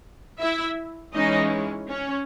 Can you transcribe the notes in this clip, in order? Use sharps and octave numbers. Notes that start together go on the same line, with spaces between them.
E4 E5
E3 G#3 C#4 D#4 D#5
C#4 C#5